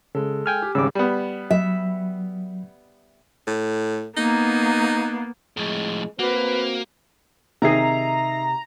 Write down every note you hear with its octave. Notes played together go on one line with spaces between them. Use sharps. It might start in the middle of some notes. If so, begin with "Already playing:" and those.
C#3 G#3 A4
G5 G#5 F6
G4
G#1 C#3 G3 D6 E6
G3 B3
F#3 E5
A2
A#3 B3 D#4
F2 A2 G#3
A#3 C4 F#4 B4
C3 D#3 D#4 G#4 E5 A#5 C7